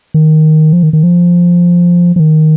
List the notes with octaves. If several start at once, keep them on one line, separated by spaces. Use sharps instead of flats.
D#3
F3
D#3
D#3
F3
F3
D#3